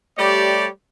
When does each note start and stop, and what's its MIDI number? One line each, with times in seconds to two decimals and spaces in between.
0.18 0.66 55
0.18 0.66 57
0.18 0.66 67
0.18 0.66 73
0.18 0.66 74